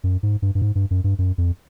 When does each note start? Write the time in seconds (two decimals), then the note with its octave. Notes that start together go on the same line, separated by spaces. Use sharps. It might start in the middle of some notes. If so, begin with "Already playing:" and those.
0.04 F#2
0.23 G#2
0.42 G2
0.55 G2
0.62 G#2
0.75 G2
0.91 F#2
1.04 G2
1.19 F#2
1.38 F2